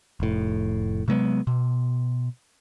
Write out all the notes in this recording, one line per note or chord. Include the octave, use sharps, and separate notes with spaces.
F1 A2
C3 F#3 G#3 B3
B2